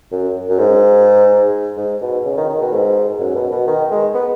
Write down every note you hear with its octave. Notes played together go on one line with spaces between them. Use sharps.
F#2
F#2
G#2
G#2
B2
C#3
D#3
D#3
B2
G#2
F#2
B2
B2
D#3
G#3
B3